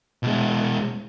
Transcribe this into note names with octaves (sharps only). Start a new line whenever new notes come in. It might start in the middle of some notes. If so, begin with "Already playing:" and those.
B2 G#3